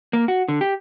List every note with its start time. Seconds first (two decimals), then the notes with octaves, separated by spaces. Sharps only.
0.13 A#3
0.28 F#4
0.48 D3
0.61 G4